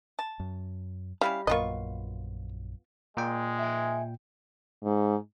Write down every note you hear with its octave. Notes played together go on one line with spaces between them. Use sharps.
A5
F#2
G3 C#4 E4 F5
A#1 F#2 A#3 B3 F4 D#5 C#6
A#2 G#3 G5
E5 G#5
G#2